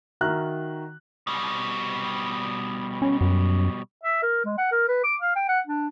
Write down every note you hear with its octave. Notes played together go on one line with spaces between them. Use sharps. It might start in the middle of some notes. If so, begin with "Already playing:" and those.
D#3 F#4 E5 A#5 F6 F#6
B2 G3
C#4
F#2
E5
A#4
G#3
F#5
A#4
B4
D6
F5
G5
F#5
D4